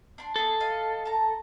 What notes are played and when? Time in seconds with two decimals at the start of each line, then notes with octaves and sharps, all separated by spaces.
0.18 D4 B5 C6
0.36 B3 G#4 A4
0.60 D#5 F5
1.05 A5 A#5